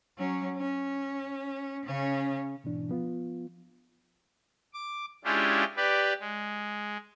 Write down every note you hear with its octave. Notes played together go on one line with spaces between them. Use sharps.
F#3 C#4
C#4
C#3 C#4
G#2 B2 E3 D4
F3 B3 F4
D6
G#3 C#4 D4 E4 F4 G4
G4 B4 D5
G#3